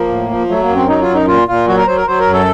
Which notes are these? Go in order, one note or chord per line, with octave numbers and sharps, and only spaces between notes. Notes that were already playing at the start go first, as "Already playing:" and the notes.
Already playing: F3 A#3
A2
F3
F#3 A3
A#3
F#2
C4
F#3 D#4
F4
F#2
D#4
A#2 F4
A#2 F4
F#3 F#4
A#4
F#3 C5
A#4
F#3 C5
A#4
F#2
A4